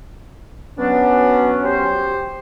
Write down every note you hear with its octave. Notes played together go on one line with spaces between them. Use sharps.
F#3 B3 C#4 D4
G4 C5